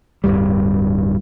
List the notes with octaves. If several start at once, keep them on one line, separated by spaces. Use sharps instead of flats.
D1 G1 G2 G3